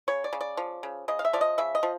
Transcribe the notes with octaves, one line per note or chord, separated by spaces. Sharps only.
C#3 C#5
D5
C#3
D5
F3
C#3
C#3 D#5
F5
E5
F3 D5
D#5
C#3 E5
D#5
F3